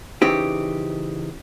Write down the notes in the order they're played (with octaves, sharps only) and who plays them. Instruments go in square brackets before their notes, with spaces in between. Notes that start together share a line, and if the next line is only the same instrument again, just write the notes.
[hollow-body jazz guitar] C#3 E3 C4 D#4 G4